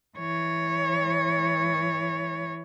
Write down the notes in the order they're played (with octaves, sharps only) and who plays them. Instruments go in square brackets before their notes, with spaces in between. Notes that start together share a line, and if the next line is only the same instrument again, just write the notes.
[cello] E3 C#5